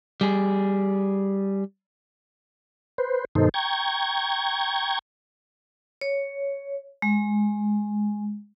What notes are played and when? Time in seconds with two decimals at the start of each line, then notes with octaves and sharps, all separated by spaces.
0.21 G3 G#4
2.98 B4 C5
3.35 G2 B2 D#3 D#4 A4 C5
3.54 G5 A#5 C#6 G#6
6.01 C#5
7.02 G#3